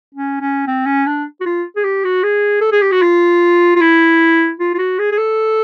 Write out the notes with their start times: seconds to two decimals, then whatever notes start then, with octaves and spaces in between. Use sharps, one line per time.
0.14 C#4
0.41 C#4
0.67 C4
0.86 C#4
1.06 D4
1.41 F#4
1.46 F4
1.76 G#4
1.84 G4
2.05 F#4
2.23 G#4
2.61 A4
2.72 G#4
2.82 G4
2.92 F#4
3.02 F4
3.76 F4
3.81 E4
4.60 F4
4.74 F4
4.78 F#4
4.99 G#4
5.12 G#4
5.18 A4